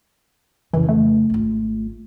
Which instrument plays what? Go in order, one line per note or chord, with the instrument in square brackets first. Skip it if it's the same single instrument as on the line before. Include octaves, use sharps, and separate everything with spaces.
[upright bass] F2 C#3 [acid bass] E3
[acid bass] A3
[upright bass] G#1 F4